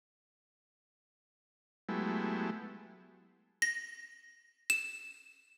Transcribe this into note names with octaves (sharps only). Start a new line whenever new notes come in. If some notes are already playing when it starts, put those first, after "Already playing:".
F#3 G#3 A3 B3 E4 G4
A#6
E7